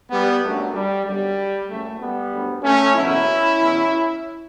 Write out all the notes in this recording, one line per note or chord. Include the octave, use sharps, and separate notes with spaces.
G3 B3
G1 F#2 D3 F#3 A3
G3
G1 F#2 D3 G3
F#1 F#2 C#3 F#3 A3
G3 B3
D2 D3 F#3
A3 C#4
F#1 E2 B2 F#3 C#4 E4
E2 B2 F#3